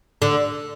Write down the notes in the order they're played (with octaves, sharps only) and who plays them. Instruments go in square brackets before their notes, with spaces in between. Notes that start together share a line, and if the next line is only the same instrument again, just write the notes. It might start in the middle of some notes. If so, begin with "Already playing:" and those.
[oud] D3